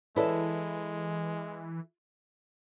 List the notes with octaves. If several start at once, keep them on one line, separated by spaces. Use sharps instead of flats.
E3 G#3 E4 A4 B4 C#5 D5